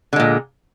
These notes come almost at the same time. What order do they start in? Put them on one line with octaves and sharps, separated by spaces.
D3 G#3 A#2